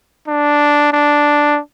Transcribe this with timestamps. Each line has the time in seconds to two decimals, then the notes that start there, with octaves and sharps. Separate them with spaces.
0.28 D4
0.93 D4